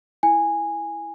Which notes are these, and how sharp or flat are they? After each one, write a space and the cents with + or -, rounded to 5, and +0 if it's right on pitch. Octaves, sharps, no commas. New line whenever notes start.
E4 +0 G#5 -10